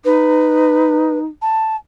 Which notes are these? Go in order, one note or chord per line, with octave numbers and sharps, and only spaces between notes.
D#4 B4
A5